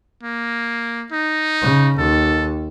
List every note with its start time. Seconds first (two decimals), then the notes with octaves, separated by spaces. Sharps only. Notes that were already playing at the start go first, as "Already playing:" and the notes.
0.24 A#3
1.12 D#4
1.62 C#3
1.98 D#2 A4